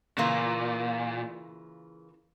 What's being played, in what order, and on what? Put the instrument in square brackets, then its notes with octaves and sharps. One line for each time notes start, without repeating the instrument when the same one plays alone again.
[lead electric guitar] A#2 [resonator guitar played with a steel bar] C#3 E3 A#3 F4